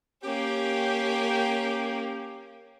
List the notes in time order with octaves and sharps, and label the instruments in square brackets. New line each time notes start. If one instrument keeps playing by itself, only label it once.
[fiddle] A#3 C#4 [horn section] G4